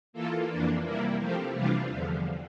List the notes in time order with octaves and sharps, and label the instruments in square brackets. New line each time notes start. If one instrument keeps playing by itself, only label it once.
[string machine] E3 A#3 F4 A4
F2 E3 A#3 D4
C3 G3 A#3 E4
F3 A3 C4 G4
C3 E3 G3 D4 F4
E2 D3 F3